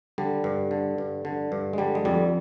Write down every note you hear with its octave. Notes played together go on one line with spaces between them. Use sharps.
D3 G3
G2
D3
G2
D3
G2
G#3
D3 G3
G#3
F2 G3